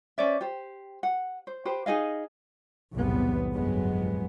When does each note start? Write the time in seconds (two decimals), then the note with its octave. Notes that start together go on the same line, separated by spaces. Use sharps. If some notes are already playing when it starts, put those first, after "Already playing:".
0.18 C#4 C5 D5 E5
0.41 G4 C5
1.03 F#5
1.47 C5
1.65 G4 B4 C5
1.86 D#4 G#4 D#5 F5
2.94 B1 E2 A2 C3 G3 B3
3.55 G1 F2 A2 F#3 G#3 B3